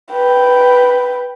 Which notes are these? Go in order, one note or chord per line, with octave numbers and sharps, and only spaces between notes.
B4 G5